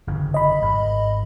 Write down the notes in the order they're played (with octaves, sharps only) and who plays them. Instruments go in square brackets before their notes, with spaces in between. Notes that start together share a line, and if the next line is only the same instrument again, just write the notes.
[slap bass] G1 F2 C#3
[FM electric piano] D#5 B5
[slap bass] G#1